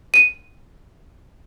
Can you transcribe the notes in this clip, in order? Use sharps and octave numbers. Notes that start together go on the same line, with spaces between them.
D#7